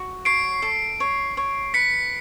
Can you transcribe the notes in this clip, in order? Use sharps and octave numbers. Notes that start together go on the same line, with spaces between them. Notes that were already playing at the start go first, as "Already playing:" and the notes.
Already playing: F#4
C#5 C7 D7
A4
C#5
C#5
B4 B6 C#7